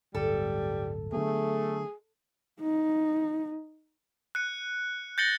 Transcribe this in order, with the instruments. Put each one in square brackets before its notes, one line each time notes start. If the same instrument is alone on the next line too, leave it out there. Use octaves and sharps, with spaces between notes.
[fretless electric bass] D1 G1 [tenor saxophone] G3 [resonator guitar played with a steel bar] A4
[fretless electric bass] D3 F#3 B3 [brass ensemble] A3 [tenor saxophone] G#4
[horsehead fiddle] D#4
[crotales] F#6 C#7
G6 A6 A#6 C#7 F#7 G7